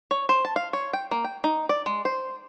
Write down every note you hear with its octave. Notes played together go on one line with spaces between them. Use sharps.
C#5
C5
A5
F5
C#5
G5
A#3
G5
D#4
D5
G#3
C5